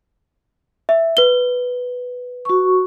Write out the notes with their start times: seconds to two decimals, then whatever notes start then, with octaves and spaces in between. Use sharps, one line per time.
0.89 E5
1.17 B4 G7
2.45 F#4 C#6